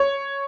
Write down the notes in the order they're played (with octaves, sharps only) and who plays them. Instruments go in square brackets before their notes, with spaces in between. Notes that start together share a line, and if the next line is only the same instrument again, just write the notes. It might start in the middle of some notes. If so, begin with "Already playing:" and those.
Already playing: [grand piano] C#5